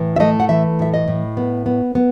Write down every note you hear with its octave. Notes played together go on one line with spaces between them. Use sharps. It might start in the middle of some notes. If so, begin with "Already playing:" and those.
Already playing: A2 E3
E5
A3 D#5
F#5
E3 E5
A2 E5
D#5
A2
B3
B3
B3